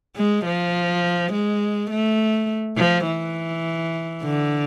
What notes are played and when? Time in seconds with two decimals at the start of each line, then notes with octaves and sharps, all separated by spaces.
0.16 G#3
0.45 F3
1.32 G#3
1.91 A3
2.77 F3
3.07 E3
4.23 D3